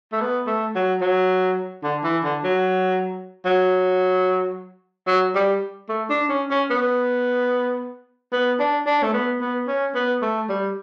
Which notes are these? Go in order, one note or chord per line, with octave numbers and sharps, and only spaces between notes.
A3
B3
A3
F#3
F#3
D3
E3
D3
F#3
F#3
F#3
G3
A3
D4
C#4
C#4
B3
B3
D4
D4
A3
B3
B3
C#4
B3
A3
G3